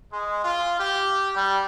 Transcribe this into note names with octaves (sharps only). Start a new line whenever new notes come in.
G#3
F4
G4
G3